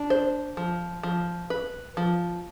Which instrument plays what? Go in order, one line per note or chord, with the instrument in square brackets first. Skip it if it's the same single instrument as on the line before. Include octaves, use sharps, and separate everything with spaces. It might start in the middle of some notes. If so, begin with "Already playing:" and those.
Already playing: [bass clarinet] D4
[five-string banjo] C5
F3
F3
B4
F3